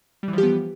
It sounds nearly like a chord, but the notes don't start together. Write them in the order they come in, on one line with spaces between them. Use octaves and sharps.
G3 E3 F3 G4 B3